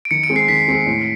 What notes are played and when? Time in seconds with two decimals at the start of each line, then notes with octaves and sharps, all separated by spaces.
0.05 D7
0.11 D#3 C#7
0.24 D7
0.30 G#3 C4
0.36 C7
0.48 D#3 B6
0.68 G#3 C4
0.86 A2